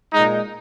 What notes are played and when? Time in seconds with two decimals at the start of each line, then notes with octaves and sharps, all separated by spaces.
0.13 A#2 G#3 D#4